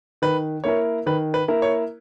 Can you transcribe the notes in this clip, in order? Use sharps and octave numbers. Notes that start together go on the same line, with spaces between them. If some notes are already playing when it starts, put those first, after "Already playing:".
D#3 B4
A#3 E4 A#4 C#5
D#3 B4
B4
A#3 E4 A#4
C#5